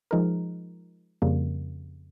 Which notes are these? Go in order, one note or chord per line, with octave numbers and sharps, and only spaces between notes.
F3 G#3 D#4 A#4
F2 C#3 G3 A#3